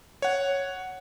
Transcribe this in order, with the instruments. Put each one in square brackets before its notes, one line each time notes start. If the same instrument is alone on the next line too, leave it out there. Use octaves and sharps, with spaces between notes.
[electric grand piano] C#5 F#5